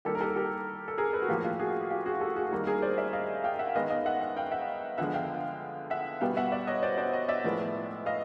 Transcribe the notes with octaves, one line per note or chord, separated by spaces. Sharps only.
D#3 G3 A#3 G4 A4
A#4
G4 A4
G4 A4
A4
G#4 A#4
A4 B4
F#4
A2 F3 A#3 F4 G4
F4 G4
F#4 G#4
F4 G4
F#4 G#4
G4 A4
F#4 G#4
D#3 G3 A#3
G#4 A#4
C5 D5
D5 E5
D#5 F5
F5 G5
E5 F#5
D#3 G#3 B3 D#5 F5
D#5 F5
E5 F#5
E5 F#5
F5 G5
E5 F#5
D3 F3 G#3 B3 E5 F#5
F5 G5
E5 F#5
B2 G3 B3 F5 G5
E5 F#5
D5 E5
C#5 D#5
C5 D5
C5 D5
C#5 D#5
D5 E5
A2 F3 G#3 B3
D#5 F5